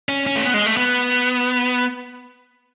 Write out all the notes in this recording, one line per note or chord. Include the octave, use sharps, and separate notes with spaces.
C#4
C#4
A3
B3
G#3
A3
B3